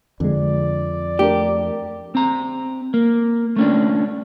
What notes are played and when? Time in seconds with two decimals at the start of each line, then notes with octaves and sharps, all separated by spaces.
0.20 F2 D3 G#3 D5
1.19 A3 D4 G4 A#4
2.15 C4 A#5
2.94 A#3
3.56 A3 C#4 D4